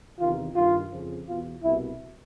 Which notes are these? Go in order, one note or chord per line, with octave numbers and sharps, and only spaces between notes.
E2 C3 D#3 F4
G2 D#3 F4
F2 C#3 F3
E2 B2 F4
C2 B2 E4